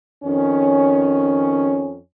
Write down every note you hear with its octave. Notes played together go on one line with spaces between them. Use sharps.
F2 D#3 C#4